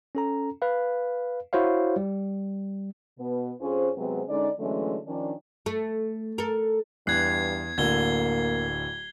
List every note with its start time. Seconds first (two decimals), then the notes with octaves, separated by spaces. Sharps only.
0.15 C#4 A4 A#5
0.62 B4 F5
1.53 E4 F#4 C5 C#5 F5
1.96 G3
3.20 B2 B3
3.60 F2 C#4 F4 G#4 C5
3.96 C3 F#3 G#3 B3 C4
4.29 D3 G#3 C#4 D#4 D5
4.59 D3 E3 F#3 G#3 A3 C#4
5.06 D#3 F3 C#4 D4
5.66 A3
6.38 A4 A#4
7.07 E2 G2 F#6 G#6 C7
7.78 D1 D3 A#3 G#6 G7